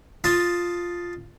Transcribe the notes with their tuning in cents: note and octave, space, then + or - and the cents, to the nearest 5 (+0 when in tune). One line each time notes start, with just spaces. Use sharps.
F4 +0 D#5 +0 A5 +0